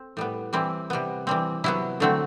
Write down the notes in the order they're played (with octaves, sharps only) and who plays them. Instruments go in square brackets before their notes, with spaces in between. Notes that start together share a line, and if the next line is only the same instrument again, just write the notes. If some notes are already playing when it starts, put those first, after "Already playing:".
Already playing: [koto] C4 A4
A2 G3 B3
E3 G3 C4 E4
C3 G3 B3
E3 G3 C4
C3 F#3 B3 E4
D3 F#3 A3 C4